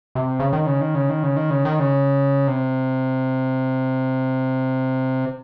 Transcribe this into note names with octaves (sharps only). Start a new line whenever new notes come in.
C3
C#3
D#3
C#3
D#3
C#3
D#3
C#3
D#3
C#3
D#3
C#3
C3